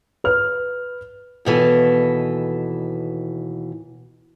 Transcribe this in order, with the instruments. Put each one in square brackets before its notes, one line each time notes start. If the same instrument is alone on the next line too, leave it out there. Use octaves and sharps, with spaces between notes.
[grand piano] B4 F6
[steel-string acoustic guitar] D#2 B2 E3 A4